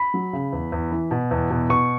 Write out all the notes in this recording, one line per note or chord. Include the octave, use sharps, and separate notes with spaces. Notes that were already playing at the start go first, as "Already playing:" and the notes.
Already playing: B5
F#3
C#3
E2
E2
E3
B2
E2
B2
B2 C#6